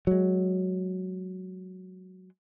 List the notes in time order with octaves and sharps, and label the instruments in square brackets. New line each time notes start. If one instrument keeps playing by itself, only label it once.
[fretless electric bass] F#3 G#3